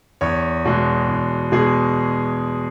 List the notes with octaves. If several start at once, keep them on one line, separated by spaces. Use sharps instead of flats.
E2 C#5
B2 G#3 F#4
E2
B2 G#3 G#4